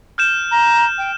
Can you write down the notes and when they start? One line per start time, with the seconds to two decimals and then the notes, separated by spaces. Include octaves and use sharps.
0.18 F6 G6 E7
0.51 A#5
0.98 G5